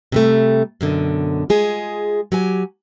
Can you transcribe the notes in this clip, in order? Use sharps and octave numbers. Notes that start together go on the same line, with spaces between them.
C3 G3 A3
F#2 B2 D3
G#3 F4 G#4
F#3 G4 G#5